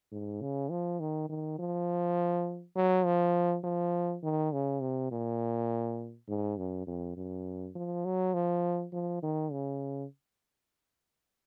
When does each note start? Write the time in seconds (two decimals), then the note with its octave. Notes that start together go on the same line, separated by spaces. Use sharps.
0.11 G#2
0.41 C#3
0.71 F3
1.00 D#3
1.29 D#3
1.59 F3
2.76 F#3
3.05 F3
3.64 F3
4.23 D#3
4.52 C#3
4.81 C3
5.11 A#2
6.28 G#2
6.57 F#2
6.87 F2
7.17 F#2
7.75 F3
8.05 F#3
8.34 F3
8.92 F3
9.22 D#3
9.52 C#3